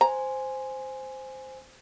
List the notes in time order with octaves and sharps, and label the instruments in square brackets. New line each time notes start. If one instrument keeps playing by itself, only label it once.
[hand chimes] C5 G#5 [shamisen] A#5